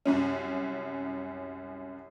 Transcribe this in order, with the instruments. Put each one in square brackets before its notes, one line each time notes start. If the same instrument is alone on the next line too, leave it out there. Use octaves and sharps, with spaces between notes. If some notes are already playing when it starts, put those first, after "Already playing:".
[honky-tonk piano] C2 F#2 C#4